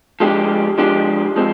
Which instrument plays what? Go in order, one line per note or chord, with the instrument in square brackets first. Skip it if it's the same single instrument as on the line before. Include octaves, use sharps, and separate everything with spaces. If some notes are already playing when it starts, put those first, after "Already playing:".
[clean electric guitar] F3 G#3 D4 G4
F3 G#3 D4 G4
F3 G#3 C4